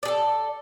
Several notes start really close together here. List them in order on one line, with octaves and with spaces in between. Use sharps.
D5 G#4 A4